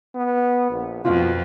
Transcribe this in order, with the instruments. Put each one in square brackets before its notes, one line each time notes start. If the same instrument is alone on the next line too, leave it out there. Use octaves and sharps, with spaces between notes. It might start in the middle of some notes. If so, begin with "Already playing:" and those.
[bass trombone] B3
A#1
[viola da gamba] F2 [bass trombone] B2 [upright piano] F4